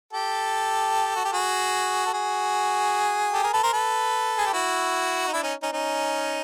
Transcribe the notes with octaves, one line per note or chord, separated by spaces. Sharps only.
G4 A4
F#4
G4
F#4 G#4
A4
F#4 G#4
G4 A4
G#4 A#4
A4 B4
A#4 C5
A4 B4
G#4
G4
E4 F#4
D#4
D4 E4
C#4 D#4
C#4 D#4
C#4 D#4